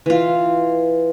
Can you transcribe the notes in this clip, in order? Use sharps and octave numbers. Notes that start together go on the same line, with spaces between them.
E3 F4